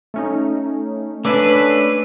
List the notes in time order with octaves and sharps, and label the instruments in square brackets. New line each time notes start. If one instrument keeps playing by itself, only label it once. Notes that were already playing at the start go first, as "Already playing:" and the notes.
[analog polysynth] A3 C#4 D#4
[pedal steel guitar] A3 C#4 D4 [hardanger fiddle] B4 [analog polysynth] D6 E6